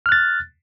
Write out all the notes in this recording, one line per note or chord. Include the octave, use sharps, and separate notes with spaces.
F6 F#6 A6